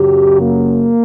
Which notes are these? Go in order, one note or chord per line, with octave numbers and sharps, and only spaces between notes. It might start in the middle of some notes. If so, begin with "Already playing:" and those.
Already playing: F#2 C#3 F#3 G4
A#3